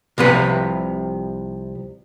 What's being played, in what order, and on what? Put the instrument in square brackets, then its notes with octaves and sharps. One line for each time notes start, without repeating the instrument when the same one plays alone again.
[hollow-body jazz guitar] C2 C3 F3 B4